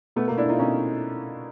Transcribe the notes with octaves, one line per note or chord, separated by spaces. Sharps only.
B2 A3 B3
A#3
B2
D4 E4
B2 D#4 F4
B2 C#4 D#4